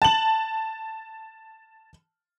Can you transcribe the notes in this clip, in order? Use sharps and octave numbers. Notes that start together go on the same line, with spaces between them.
A5 F#7